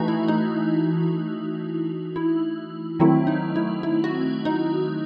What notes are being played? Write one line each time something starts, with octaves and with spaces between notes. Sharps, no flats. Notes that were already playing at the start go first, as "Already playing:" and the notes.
Already playing: E3 A3 D#4 F#4
E4
D#4
E4
D#3 F#3 A3 C4 E4
D#4
E4
E4
F#4
D#4